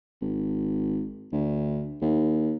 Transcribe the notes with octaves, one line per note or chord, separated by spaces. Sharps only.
G#1
D2
D#2